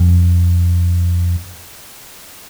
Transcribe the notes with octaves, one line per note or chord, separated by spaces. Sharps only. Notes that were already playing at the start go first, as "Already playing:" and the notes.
Already playing: F2